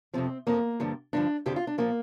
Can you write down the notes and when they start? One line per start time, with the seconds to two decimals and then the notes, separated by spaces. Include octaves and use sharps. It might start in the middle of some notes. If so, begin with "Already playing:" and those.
0.13 F2 C3 F3 C4
0.47 F2 F3 A#3
0.80 G2 D3 F3
1.13 G2 D3 F3 D4
1.46 F2 D3 F3 G4
1.56 F4
1.67 D4
1.78 A#2 F3 A#3